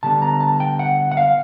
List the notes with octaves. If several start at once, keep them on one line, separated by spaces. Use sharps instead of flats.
D3 G3 B3 A5
A#5
A5
G5
F#5
F#5
F5